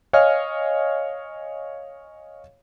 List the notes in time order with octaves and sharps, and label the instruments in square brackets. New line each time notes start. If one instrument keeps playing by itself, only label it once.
[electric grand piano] C#5 D#5 F5 G#5 F6